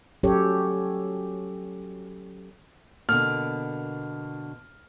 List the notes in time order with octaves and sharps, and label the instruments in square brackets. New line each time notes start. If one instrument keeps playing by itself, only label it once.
[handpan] F#3 C#4 G4 A4 C#5
[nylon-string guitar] B2 D3 A#3 [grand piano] F6